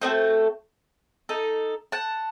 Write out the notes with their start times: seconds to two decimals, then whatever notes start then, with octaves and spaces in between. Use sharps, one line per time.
0.02 A3 C4 F#4 A4 C5 D#5
1.29 D#4 A4
1.92 F#5 A5